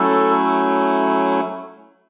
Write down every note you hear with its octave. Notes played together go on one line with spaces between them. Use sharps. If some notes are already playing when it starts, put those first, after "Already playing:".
Already playing: F#3 A3 C#4 E4 A4